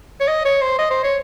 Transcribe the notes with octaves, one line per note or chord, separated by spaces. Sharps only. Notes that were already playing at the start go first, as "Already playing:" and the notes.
C#5
D#5
C#5
C5
D#5
C5
C#5